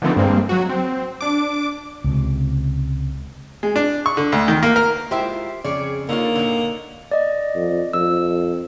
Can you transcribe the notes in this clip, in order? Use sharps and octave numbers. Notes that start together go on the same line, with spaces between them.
D3 D#3 F3 A3 B3 C4
G2 G#3 A#3 C4
F#3 F#4
C4
D4 D6
C#2 C3
G#3
D4
C#6
D3
D2
D#3
A#3
A#4
G#3 E4 F4 G4 C5 E5
F2 C#3 G#4 C#5 D5
D3 A#3 D4 D#4 F4 C#5
A#2 D3
D5 D#5
F2
F2 E6